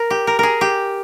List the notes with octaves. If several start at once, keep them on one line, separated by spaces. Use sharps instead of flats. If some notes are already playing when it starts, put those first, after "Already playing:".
Already playing: A#4
G4
A#4
G#4 A#4
G4